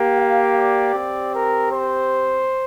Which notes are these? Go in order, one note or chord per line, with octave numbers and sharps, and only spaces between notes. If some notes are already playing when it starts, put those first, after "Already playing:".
Already playing: A#3 G4
F5
D5
C4 G4
A#4
C5